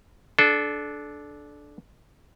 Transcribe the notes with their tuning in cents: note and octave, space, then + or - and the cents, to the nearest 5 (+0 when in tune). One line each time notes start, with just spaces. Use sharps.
D4 +0 A4 -30